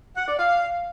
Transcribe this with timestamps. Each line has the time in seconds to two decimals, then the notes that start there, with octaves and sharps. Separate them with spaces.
0.17 F#5
0.28 D5
0.39 F5